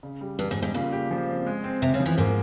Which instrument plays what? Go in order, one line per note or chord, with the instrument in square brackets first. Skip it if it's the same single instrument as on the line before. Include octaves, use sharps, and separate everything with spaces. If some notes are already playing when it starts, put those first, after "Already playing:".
[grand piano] C#3
G3
[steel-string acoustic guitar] G2 [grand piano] G3
[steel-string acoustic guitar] G#2
[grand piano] G3
[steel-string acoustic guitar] G#2
[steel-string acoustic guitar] A#2 [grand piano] C#3
[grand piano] G4
F3
C4
G#3
C4
[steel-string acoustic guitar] C3 [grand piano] C4
[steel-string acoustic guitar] C#3
[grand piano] F3
[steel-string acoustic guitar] E3
[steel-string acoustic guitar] G#2 [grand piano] A#3